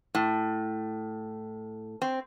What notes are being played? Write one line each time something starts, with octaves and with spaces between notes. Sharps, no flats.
A2
C4